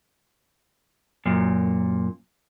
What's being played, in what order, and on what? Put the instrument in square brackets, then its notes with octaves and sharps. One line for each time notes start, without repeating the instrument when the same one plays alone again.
[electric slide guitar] F#2 A#2